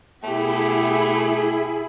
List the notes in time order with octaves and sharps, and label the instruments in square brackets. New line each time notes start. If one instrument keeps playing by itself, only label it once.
[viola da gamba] B2 B3 G4 [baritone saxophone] A3 [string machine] E4 G#4 B5